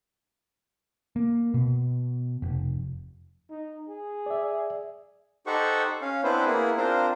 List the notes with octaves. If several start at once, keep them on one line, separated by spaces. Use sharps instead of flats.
A#3
B2
F1
D#4
G#4
D5 E5
D#4 G4 A4 C5 F#5 C#6
C#4 F5
B3 C4 D4 E4 B4 C5
A#3 B3 E4 G#4
C4 D4 F4 A#4 C5